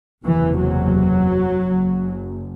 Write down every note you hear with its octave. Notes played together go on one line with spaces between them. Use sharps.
F#1 E2 C3 E3
F#3
F#1 F#2